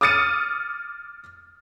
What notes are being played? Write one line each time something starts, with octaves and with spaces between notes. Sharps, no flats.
D6 D#6 F6 A6 C#7 D#7